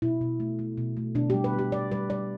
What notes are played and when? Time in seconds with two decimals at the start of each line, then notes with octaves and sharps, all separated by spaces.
0.02 B2 E4
0.21 B2
0.40 A3
0.59 A3
0.78 B2
0.97 A3
1.15 B2 D4
1.30 G3 G4
1.44 B4
1.53 G3
1.59 G4
1.72 G3 D5
1.91 G3 B4
2.10 G3 D5